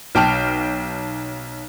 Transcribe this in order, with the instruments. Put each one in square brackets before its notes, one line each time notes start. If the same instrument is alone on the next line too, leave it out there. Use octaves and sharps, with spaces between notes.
[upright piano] B1 G5 A5 F6